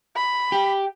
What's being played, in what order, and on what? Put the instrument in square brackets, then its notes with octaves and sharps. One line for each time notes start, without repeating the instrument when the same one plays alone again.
[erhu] B5
[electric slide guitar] G4